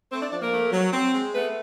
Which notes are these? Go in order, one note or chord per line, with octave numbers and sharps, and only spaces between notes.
A3 C4 C5
D4 D5
F3 D4 D5
A#3 A#4
A3
F#3
C4
G#3
A3 B3 B4